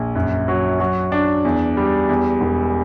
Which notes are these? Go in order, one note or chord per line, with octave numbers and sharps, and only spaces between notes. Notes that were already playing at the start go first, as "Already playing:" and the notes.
Already playing: A#1
F#2
F#3
F#3
D4
E2
G3
E2
E1